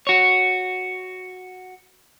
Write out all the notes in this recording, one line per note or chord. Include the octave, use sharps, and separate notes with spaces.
F#4 C#5